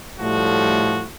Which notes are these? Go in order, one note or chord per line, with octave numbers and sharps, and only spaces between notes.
A2 F3 G3 A3 F#4